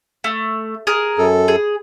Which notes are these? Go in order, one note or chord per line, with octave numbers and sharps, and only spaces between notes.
A3
G#4 A#4
F#2 A4
G#4